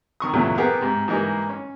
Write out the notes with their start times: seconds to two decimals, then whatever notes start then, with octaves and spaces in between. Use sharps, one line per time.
0.20 D#3 C#6 D#6
0.34 E2 A#2 C#3 F#3 A3
0.58 A#3 B3 G4 G#4 A#4 F#5
0.81 G#2 C3
1.08 G#2 E3 G3 A#3 D#4
1.49 C#4